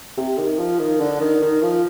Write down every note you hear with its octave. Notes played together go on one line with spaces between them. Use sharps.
C3
D#3
F3
D#3
D3
D#3
D#3
F3